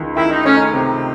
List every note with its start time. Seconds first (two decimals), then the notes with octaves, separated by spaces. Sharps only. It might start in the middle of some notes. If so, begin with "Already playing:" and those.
Already playing: C#2 D#3
0.16 D#3 E4
0.31 D#4
0.45 A3 C#4
0.57 D#4
0.74 C3